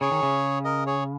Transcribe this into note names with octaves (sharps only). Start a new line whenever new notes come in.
C#3 G#4 C#5
D#3
C#3
A#4 D#5
G#4 C#5